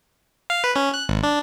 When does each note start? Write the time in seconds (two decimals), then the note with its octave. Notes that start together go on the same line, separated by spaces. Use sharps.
0.50 F5
0.64 B4
0.76 C#4
0.94 F#6
1.09 G#1
1.23 D4